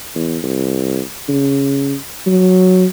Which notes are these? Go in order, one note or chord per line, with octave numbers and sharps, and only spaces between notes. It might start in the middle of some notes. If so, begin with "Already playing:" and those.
E2
C2
C#3
F#3